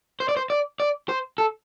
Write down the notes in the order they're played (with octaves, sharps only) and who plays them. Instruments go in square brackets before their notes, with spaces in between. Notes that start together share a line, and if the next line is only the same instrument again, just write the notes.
[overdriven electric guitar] C5
D5
C5
D5
D5
C5
A4